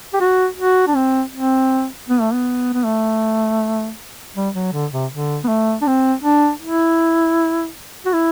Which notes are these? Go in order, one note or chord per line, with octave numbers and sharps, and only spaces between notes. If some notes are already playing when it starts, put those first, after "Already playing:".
G4
F#4
F#4
D4
C4
C4
B3
A3
B3
B3
A3
G3
F#3
D3
C3
D3
B3
A3
D4
C4
D4
E4
F#4
E4